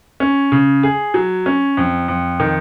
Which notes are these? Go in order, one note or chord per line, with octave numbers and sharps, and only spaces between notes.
C#4
C#3
G#4
F#3
C#4
F2
F2
D#3